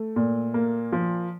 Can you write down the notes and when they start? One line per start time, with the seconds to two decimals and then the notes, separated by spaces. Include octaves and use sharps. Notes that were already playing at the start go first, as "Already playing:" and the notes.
Already playing: A3
0.16 A#2
0.54 A#3
0.93 F3